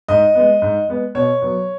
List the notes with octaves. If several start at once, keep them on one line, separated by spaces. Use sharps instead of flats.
G#2 D#5
G#3 B3
G#2
G#3 B3
B2 C#5
F#3 B3